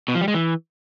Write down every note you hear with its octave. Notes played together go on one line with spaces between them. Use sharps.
B2
F3
G3
G#3
E3